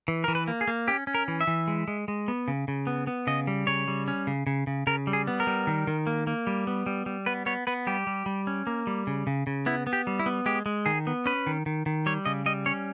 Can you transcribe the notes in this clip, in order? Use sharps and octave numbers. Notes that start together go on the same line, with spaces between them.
E3
E3 A#4
B4
A#3
G#4
A#3
C#4 G4
C#4
A#4
E3
E5
E3
G#3
G#3
G#3
B3
C#3
C#3
B3
B3
C#3 D#5
G3
C#3 C#5
G3
C#4
C#3
C#3
C#3
C#3 A#4
G3
G#4
B3
A#4
G3
D#3
D#3
A#3
A#3
G3
B3
G3
G3
B3 B4
B3 C#5
B3 B4
G3 G4
G3
G3
C#4
A#3
G3
C#3
C#3
C#3
B3 E4
B3
G4
G3
E4
B3
G#3 G4
G#3
D#3 G#4
B3
C#4 B4
D#3
D#3
D#3
G3 C#5
C#3 D#5
G3 D#5
C#4 C#5